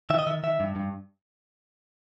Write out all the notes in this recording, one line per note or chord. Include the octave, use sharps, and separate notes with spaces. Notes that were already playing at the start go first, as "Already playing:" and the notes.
D#3 E5
D#5
D#3 E5
D#3 E5
G2
G2